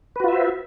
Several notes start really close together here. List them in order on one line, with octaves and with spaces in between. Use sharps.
B4 F#4 F4 E5 C5